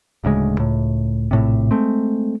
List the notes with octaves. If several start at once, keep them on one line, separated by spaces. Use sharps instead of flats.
D1 D2 C#3 G#3
C#2 A2
A#1 A2 C3
G#3 A3 C4